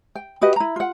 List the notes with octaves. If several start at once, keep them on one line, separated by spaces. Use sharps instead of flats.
G5
F#4 G4 B4 D#5
E4 A#5
F4 F#5